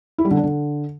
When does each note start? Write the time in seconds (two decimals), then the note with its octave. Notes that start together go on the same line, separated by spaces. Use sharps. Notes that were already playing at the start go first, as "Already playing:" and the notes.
0.18 E4
0.25 G3
0.31 D3
0.37 D4
0.43 D3